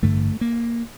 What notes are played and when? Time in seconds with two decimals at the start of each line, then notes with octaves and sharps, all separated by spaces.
0.02 A1 G2 D3 A3
0.41 A#3